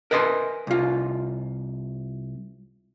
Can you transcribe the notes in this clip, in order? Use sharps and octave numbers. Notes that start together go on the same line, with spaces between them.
A#4 B4 D#5 G#5 B5 C6
C2 F4